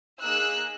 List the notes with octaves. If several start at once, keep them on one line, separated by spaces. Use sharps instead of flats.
A#3 D#4 G#4 E6 F#6